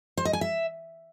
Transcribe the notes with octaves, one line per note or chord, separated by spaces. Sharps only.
C5
D#5
G#5
E5